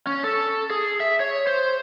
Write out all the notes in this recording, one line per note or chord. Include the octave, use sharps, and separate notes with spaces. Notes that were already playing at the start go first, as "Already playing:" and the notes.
C#4
A4
G#4
E5
C#5
C5